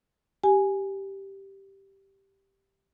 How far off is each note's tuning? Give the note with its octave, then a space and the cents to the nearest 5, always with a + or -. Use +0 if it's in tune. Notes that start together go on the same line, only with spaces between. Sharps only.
G4 -5 G#5 +0